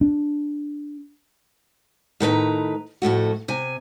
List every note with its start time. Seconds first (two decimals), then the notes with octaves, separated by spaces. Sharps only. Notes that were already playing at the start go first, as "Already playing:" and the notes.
0.01 D4
2.20 A2 D#3 B4 A#5
3.02 F2 A2 A3 F#4
3.48 C3 G#5